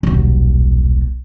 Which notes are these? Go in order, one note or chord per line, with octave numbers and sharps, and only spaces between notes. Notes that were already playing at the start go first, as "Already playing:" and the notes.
D#1 B1